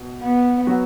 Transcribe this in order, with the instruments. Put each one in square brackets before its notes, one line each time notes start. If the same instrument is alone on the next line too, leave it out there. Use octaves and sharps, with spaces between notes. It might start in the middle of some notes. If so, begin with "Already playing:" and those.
Already playing: [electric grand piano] B2
[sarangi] B3
[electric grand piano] F#3 B3 F#4